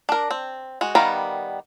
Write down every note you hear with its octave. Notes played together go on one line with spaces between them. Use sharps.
D4 A#4
C4
G#3 F#4
D#3 G3 B3 A#4 F5